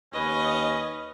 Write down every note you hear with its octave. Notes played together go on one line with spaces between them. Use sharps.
D#2 C#4 B4 D#5